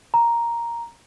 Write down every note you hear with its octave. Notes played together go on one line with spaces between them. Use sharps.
A#5